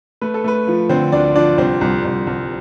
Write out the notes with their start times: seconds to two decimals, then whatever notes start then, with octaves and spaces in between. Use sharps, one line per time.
0.21 A3 B4
0.34 A4
0.44 A3 B4
0.68 F3
0.89 D3 C4 C5
1.12 D2 D4 D5
1.35 F3 D4 D5
1.58 C2 C4 C5
1.81 C2
2.05 C2
2.27 C2